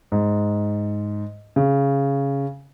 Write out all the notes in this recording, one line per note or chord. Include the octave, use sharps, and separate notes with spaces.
G#2
C#3